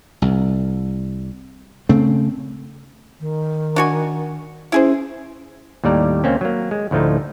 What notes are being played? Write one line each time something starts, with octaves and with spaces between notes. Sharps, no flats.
C2
C#3 A3 C4
D#3
D4 F#4 G#5
C#4 E4 G#4 C5
D#2 A2 G3 D5 A#5
C#2 A#3 C4 C#4
F#3 A#3
G#3
D2 A2 F3 A3 D#4